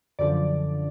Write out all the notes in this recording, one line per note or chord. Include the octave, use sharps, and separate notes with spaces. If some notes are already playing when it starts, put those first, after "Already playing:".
F#2 D3 F3 D5